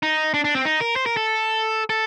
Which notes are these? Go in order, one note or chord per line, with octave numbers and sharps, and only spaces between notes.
D#4
D4
D4
C4
D#4
A#4
C5
A#4
A4
A4